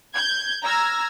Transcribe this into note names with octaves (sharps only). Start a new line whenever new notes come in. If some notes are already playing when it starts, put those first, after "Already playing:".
G6 G#6
A#5 E6 F6 G#6 A#6